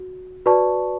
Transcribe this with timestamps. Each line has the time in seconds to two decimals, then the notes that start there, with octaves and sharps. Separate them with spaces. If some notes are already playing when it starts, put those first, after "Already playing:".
Already playing: F#4
0.46 F#4 B4 D5 A5 C#6